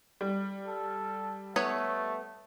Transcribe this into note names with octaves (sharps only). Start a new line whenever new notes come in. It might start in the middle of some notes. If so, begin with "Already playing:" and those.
G3
A4
A3 B3 B4 C#5